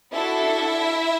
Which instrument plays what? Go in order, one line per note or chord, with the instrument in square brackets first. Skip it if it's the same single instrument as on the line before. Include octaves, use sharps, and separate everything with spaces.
[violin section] D4 E4 F#4 A4 E5